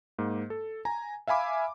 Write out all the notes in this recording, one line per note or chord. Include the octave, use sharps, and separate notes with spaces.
G#2 A#3
A4
G#5 A#5
E5 F5 G#5 B5 D6